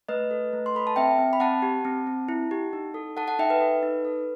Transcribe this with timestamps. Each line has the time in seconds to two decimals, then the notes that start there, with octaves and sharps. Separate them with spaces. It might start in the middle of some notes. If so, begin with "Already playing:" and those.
0.08 A3 B4 D#5
0.31 A4
0.53 A3
0.66 C6
0.75 A4 B5
0.87 A5
0.96 C4 E5 G5
1.19 C4
1.33 B5
1.40 C4 F#5 A5
1.62 G4
1.85 C4
2.07 C4
2.29 E4
2.51 G4
2.73 D#4
2.94 A4
3.17 A4 F#5 A5
3.27 F#5 A5
3.39 D#4 E5 G5
3.50 B4
3.61 A4
3.83 D#4
4.05 A4